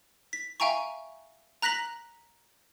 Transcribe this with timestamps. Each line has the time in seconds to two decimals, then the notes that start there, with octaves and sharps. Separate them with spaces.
0.33 B6
0.60 E5 F5 G5 G#5 A#5 C#6
1.62 A#5 F#6 A#6 B6 F#7